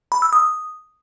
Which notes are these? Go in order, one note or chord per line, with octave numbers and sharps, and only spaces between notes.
B5
E6
D#6